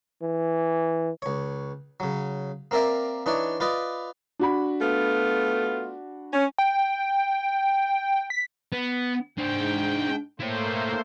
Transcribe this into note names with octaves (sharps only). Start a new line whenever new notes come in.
E3
C#2 C#5
C#3 F#3
A#3 C4 A#4 D5 E5
E3 D4 D#4 C#5 D5
F4 B4 D5 D#5
D4 F#4 B5
A3 B3 F4
C#4
G5
B6
B3
G#2 D4 C5 G5
A3 A#3 E4 C5 C#5